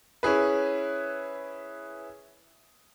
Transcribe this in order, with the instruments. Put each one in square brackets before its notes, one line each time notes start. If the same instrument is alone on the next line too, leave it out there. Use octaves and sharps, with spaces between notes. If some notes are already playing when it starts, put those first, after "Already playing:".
[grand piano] C#4 E4 G#4 B4